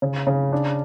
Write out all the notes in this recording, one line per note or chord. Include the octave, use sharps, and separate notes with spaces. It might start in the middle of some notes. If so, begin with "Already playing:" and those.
C#3
C#3
D4